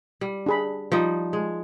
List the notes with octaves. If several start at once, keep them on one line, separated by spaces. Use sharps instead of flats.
G3
D4 G#4 B5
F3 G3 D#4
G#3